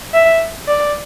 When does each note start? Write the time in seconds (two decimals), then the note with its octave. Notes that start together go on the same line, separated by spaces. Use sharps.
0.14 E5
0.68 D5